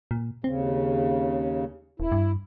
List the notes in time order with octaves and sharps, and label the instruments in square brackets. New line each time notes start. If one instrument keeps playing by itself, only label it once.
[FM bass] A#2
[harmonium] D#2 C#3 [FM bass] C4
[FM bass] D#1 [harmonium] E4
[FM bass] G2